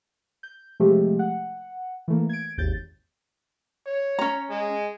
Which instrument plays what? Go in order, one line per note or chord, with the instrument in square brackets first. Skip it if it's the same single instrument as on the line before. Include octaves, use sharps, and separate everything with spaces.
[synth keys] G6
C3 F3 G#3 A3 G4
F#5
E3 A3 A#3
G#6 D7
G#1 D#2 G6 A6
[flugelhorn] C#5
[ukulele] C#4 A#5
[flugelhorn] G#3